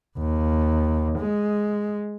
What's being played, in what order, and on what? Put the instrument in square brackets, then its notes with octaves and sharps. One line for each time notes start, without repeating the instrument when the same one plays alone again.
[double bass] D#2
G#3